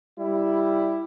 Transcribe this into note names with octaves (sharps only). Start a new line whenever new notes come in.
G3 E4